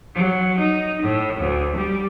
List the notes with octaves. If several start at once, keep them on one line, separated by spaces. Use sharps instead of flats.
F#3
D#4
A2
D2
G3